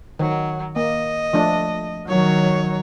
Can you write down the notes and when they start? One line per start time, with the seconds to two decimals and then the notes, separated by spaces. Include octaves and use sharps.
0.19 D#3 F#3
0.76 A#3 D#5
1.33 F3 A3 D4
2.08 D#3 F#3 C#5